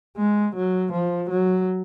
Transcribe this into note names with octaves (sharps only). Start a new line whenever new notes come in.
G#3
F#3
F3
F#3